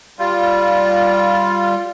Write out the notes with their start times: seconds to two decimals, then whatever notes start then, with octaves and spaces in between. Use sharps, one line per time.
0.19 G3 F4